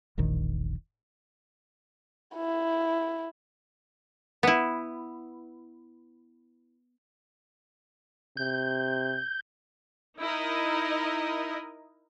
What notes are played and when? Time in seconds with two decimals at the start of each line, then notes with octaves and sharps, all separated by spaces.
0.18 E1 A#1 D#3
2.36 E4
4.43 B3 E4
8.37 C3 G6
10.19 D#4 E4 A#4 D#5